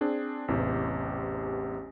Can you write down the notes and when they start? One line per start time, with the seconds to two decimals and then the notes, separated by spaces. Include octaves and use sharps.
0.01 C4 D4 G#4
0.48 A1 E2 C3 E3 G4